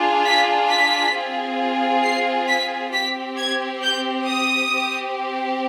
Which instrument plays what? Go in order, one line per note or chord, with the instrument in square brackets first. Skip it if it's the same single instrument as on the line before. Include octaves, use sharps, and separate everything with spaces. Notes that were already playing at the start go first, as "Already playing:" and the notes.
Already playing: [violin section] D4 F4 G#4
B6
B6
C4 F4 G#4
C7
B6
C4 G4 B6
G#6
G6
D#6
C4 G4